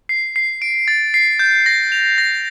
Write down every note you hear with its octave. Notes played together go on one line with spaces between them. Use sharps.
C7
C7
D7
A6
C7
G6
A#6
F7
A#6